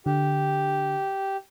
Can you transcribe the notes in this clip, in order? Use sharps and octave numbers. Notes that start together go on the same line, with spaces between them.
D3 G4